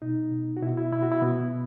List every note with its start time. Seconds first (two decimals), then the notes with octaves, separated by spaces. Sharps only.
0.02 B2 D#4
0.32 B2
0.57 F#4
0.62 B2 E4
0.77 E4
0.92 B2 E4
1.03 F#4
1.12 E4
1.22 B2 B3